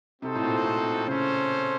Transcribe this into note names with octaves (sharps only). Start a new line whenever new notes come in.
C3 C4 D#4 F#4 A4 C5
A2
A#2
A2
C#3 C#4 A4 C5